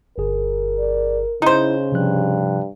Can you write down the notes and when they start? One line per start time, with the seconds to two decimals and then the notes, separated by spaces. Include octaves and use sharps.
0.18 G1 G#4 A#4
0.79 D5
1.42 C#3 D#4 E4 C5
1.92 G2 C3 F3 F#6